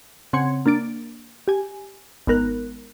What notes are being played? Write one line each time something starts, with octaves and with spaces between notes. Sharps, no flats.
C#3 C4 F#5 C6 G#6 C#7
A#3 D4 A6 D7
G4 G#5
G#1 B3 A#4 F#6